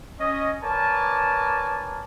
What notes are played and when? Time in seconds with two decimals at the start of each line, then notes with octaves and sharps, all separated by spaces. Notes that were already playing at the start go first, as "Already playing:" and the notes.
0.19 C#4 D#5
0.63 A#4 B4 C#5 D5 G#5 A5